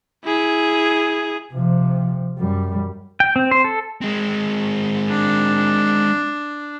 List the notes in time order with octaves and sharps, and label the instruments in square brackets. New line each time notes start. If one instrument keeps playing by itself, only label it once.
[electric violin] E4 G#4
[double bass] C3 F3
F#2 G3
[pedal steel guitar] G5
C4
C5
A4
[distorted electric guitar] G#3 C4
[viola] D4